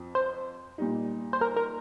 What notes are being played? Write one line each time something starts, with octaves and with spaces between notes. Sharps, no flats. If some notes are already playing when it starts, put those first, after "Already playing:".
Already playing: F2 F3
C5
A#2 G3 D#4
C5
A#4
A#4